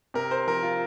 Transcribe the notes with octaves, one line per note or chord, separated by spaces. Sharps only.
C3 A#4
C5
F3 A#4
F4